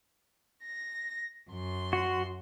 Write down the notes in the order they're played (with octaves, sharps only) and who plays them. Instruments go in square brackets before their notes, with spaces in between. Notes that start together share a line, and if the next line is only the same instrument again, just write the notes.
[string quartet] A#6
F#2 C6
[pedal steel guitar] F#4